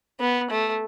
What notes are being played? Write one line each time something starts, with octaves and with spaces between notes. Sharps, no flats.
B3
A3